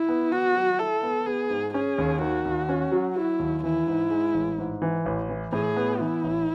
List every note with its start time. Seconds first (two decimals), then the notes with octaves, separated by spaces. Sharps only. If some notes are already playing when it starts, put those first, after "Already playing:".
Already playing: E4
0.09 B3
0.32 B3 F#4
0.55 F#3
0.79 E4 A4
1.03 B3
1.26 B3 G#4
1.50 G#2
1.74 C#4 G#4
1.98 D#2
2.21 D#3 F#4
2.45 D#2
2.69 C#4
2.92 F#3
3.16 F#3 E4
3.39 D#2
3.63 E3 E4
3.87 G#2
4.10 G#3
4.34 A1
4.58 G#2
4.82 E3
5.06 A1
5.29 E3
5.52 A2 G#4
5.77 B3
6.00 E3 E4
6.24 A1